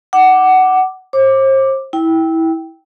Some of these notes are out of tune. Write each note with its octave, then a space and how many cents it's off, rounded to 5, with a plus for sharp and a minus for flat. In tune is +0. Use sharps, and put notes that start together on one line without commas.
F#5 +15 D6 +0
C5 +40 D6 +0
E4 -20 G5 +0